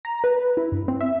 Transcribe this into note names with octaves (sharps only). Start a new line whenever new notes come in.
A#5
B4
E4
G2
C4
E5